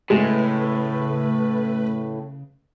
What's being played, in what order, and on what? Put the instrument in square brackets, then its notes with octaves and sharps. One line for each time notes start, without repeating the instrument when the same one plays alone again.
[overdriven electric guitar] A2 [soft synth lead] C#3 [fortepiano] G#3 [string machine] A3 B4